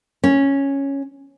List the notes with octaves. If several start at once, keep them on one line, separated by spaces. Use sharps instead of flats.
C#4